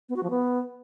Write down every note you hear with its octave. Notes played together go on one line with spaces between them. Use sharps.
B3
F#4
F3
B3